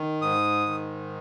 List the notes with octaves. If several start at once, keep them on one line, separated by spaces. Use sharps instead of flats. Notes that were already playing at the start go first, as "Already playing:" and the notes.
Already playing: D#3
G#2 D#6
D#3